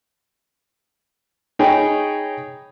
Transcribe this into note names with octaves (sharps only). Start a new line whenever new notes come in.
D#4 G#4 C#5 G5 B5